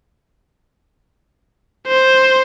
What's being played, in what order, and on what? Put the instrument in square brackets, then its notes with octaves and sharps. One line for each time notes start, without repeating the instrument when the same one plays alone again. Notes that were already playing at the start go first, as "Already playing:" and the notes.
[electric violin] C5